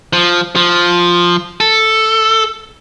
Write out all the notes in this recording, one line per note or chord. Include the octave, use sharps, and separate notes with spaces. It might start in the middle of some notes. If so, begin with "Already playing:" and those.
F3
F3
A4